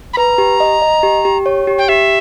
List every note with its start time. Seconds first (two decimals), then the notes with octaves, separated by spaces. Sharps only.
0.14 B5
0.17 B4 A#5
0.38 G4
0.60 D#5
0.82 D#5
1.03 G4
1.25 G4
1.46 C#5
1.67 G4
1.78 G5
1.89 G4 E5